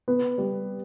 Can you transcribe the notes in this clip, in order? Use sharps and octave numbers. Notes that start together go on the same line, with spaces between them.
B3
G3